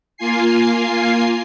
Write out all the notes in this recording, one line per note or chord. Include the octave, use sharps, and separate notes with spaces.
A#3 F4 G#5 C7